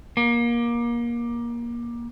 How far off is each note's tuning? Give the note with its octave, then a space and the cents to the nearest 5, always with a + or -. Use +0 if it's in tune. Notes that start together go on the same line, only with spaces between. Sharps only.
A#3 +25